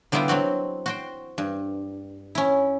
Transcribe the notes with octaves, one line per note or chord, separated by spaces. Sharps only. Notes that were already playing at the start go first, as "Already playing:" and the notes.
D3 G3 B3 E4 F4 G5
F#3 C4 F#4 D5
F#4 C5 G5
G2
C#4 E4